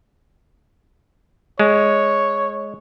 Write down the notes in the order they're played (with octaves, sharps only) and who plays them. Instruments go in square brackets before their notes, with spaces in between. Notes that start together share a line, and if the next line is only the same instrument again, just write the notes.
[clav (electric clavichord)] G#3 [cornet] C#5